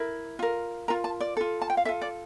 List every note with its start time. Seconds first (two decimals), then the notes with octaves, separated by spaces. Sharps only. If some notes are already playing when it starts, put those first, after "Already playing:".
Already playing: E4 A#4
0.39 F4 A#4
0.88 F4 A#4 A#5
1.04 A5
1.20 D5
1.37 F4 A4
1.61 A5
1.70 G5
1.77 F5
1.85 F4 A4 E5
2.01 D5